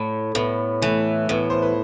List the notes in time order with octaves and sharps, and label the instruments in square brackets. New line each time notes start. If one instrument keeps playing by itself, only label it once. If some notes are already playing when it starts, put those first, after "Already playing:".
Already playing: [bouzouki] A2 [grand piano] A3
[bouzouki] A2 [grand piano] B3
[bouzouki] E3 [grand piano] A3
[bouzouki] A2 [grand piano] B3
[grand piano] C5
B4